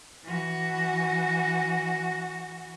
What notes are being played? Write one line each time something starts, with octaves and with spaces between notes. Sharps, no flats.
E3 F#4